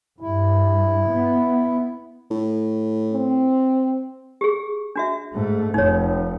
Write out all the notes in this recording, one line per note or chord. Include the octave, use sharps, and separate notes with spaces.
G2 E4
B3
A2
C4
G4 G#4
D4 F#4 E5
G#2 A3
F1 D#4 C#5